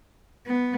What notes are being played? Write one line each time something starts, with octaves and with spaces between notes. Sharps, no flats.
B3